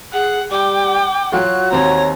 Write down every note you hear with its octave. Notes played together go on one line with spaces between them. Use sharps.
G#4 F#5
G3 G5 D6
F#3 F4 F#4 F#6
D#2 C4 C#5 A#5